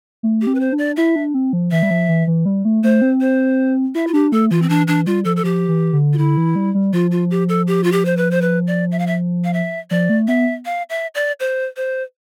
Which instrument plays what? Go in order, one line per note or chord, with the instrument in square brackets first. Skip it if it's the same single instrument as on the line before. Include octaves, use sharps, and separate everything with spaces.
[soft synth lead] A3
[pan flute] G4
[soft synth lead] C4
[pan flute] B4
C5
[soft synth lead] D4
[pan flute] D5
[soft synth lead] E4 [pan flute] E5
[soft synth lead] D4
C4
F3
[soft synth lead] E3 [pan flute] E5
[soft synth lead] G3
F3
E3
E3
G3
A3
[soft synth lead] A3 [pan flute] C5
[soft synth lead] C4
[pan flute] C5
[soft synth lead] E4 [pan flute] E5
[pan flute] F4
[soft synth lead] D4 [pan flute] G4
[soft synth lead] A3 [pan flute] A4
[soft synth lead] E3 [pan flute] F4
[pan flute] C4
[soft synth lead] E3 [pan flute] D4
[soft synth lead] E3 [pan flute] D4
[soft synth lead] G3 [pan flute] F4
[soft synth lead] F3 [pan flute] A4
[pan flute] A4
[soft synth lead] F3 [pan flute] G4
[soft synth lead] E3
D3
[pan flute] F4
[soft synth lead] D3 [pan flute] E4
[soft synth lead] E3
G3
G3
[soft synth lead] F3 [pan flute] F4
[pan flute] F4
G4
A4
G4
F4
G4
C5
B4
C5
B4
D5
E5
F5
E5
F5
E5
[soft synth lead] F3 [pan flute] D5
[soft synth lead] A3
[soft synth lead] B3 [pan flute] E5
[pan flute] F5
E5
D5
C5
C5